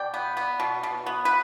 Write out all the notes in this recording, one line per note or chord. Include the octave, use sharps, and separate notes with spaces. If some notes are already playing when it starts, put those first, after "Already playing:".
Already playing: B2 D5 G5
B3
B3
B2
B2
B3
B4